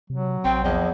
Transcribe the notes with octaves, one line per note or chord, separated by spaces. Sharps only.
C3 F#3
A#1 C4 G5
E2 F3 D#5